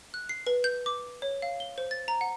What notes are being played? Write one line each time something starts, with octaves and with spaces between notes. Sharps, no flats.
F#6
C7
B4
G6
D6
C#5
F5
G7
C5
A6
A#5
F#5